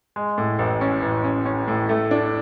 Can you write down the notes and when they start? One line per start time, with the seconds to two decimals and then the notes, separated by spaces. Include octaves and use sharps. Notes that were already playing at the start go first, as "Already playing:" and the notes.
0.16 G#3
0.38 A2
0.59 A1
0.81 C#4
1.02 A1
1.24 C#4
1.46 C#4
1.68 A2
1.89 A3
2.11 D4